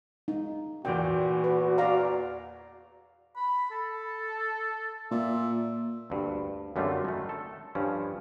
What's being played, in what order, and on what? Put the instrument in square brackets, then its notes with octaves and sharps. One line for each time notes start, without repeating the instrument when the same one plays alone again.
[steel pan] D#4
[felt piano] E2 A#2 [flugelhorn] F#4 [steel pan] G5
[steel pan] B4
D5 F5 A#5
[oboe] B5
A4
[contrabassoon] A#2 [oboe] E5
[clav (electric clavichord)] D2 G2
F#2 D3 G3 A3 C4 F4
D#3 A3
A4
G2 F3 C#4